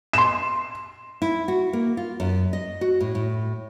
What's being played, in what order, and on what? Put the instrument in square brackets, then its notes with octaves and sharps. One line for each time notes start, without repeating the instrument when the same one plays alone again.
[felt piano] C6 E7
[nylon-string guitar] E4
F#4
A#3
F4
F#2
D#5
F#4
A2
A2